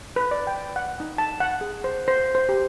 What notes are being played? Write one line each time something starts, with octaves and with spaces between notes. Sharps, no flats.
B4
D5
G5
F#5
D#4
A5
F#5
G#4
C5
C5
C5
G4